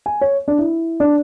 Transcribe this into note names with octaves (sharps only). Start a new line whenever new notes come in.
G#5
C#5
D4
E4
D4